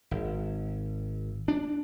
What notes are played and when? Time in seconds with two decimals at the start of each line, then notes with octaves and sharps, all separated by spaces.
0.11 G#1
1.48 D4